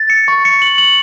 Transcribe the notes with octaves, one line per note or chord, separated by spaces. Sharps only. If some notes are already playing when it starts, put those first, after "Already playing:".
Already playing: A6
C#7
C#6
C#7
F#7
F#7